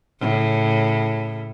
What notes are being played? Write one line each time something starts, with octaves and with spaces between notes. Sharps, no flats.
A2 C#3